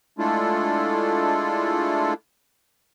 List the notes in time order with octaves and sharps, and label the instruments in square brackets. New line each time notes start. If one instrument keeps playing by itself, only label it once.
[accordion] G#3 A3 D4 E4 F4 A4